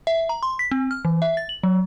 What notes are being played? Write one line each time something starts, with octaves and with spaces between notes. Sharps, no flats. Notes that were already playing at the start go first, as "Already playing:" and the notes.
E5
A#5
C6
B6
C4
F6
E3
E5
A6
F#7
F#3